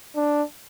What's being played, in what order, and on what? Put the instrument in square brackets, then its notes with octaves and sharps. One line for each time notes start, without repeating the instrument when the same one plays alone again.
[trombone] D4